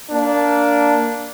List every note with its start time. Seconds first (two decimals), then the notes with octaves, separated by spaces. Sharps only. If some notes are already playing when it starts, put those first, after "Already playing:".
0.11 A#3 D4